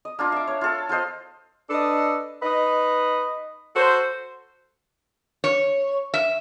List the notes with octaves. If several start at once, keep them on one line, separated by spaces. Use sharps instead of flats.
D#5
A#3 D4 F4
E5 D6
C#5
F4 A4
F4 A4 C5 D#5
D4 A4 B4 D5 D#5
D#4 B4 D#5
F#4 A4 C5
C#5
E5